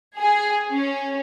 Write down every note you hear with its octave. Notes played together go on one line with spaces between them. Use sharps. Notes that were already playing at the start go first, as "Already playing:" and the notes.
G#4
C#4